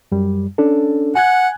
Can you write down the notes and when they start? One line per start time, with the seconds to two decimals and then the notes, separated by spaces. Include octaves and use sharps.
0.12 F#2 G3
0.58 C#4 D4 A4
1.15 F#5 G#5 F#6 G#6